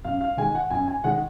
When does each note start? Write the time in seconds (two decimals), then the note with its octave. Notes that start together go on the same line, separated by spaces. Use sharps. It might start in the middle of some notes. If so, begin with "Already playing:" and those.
0.04 F#2 F5
0.21 F5
0.37 D#3 G#3 G#5
0.55 F#5
0.70 F#2 G#5
0.88 G#5
1.04 D#3 G#3 F#5